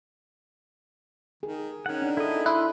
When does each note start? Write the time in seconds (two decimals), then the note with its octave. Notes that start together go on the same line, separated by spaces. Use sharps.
1.43 D#3 G#4
1.86 D#3 C#4 F#5
2.02 D4
2.17 E4 A4 D#5
2.46 E4 B5 C6 F#6